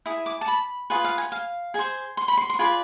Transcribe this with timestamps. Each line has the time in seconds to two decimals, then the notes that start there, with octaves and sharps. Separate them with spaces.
0.06 E4 G#4
0.26 D6
0.41 A5
0.48 B5
0.90 F4 G#4 B4 G#5
1.04 F5
1.18 G#5
1.32 F5
1.74 G#4 C5 G#5
2.17 C6
2.28 B5
2.37 C6
2.50 C6
2.59 F4 G#4 B4 D5 B5